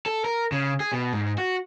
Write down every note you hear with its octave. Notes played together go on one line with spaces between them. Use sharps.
A4
A#4
C#3
G#4
B2
G#2
F#4